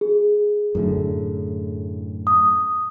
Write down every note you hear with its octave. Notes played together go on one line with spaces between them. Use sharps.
G#4
F#2 A2 D3
D#6